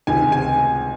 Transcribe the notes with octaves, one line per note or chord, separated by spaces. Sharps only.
C#2 C3 D#3 G#3 G#5
G#5